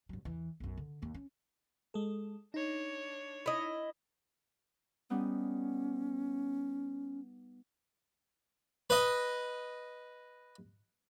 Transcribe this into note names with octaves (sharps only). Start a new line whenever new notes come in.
G2 F#3
E2 E3
B1 F#2
D3
D#2 A#3
C#4
G#3 A4
D4 D#4 C#5
E4 D#5
G3 B3 C#4 D#4
B4 D#5